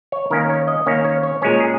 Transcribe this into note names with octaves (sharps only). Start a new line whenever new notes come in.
C#5
D#3 A#3 C#4 A#4
C#5
D#5
D#3 A#3 C#4 C#5
C#5
C#5
A#2 G#3 C#4 C#5
G#4